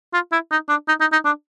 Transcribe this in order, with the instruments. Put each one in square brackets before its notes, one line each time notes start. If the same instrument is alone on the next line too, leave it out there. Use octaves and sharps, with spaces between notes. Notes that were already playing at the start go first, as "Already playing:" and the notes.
[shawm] F4
E4
D#4
D4
D#4
D#4
D#4
D4